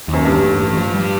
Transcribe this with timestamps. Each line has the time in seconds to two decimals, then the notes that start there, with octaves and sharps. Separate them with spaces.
0.08 D#2
0.13 F#2
0.25 A1 G2
0.43 A1
0.60 A1
0.77 F3
0.94 G3